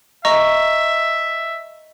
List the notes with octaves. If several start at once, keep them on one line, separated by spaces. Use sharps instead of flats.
D#5 E5 A#5 C#6